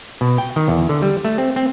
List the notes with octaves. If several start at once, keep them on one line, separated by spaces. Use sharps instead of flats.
B2
G5
D#3
E2
D3
G3
A3
C4
C4